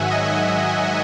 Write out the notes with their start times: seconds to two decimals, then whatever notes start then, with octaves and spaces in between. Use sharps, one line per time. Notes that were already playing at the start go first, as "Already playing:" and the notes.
Already playing: G#2 D#3 F#3 E5 F#5 G#5
0.11 D#5